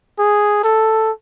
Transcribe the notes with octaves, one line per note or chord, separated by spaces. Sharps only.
G#4
A4